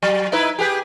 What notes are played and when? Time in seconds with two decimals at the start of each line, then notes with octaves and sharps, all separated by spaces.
0.03 F#3
0.32 D#4 E4 B4
0.59 G4 G#4 B4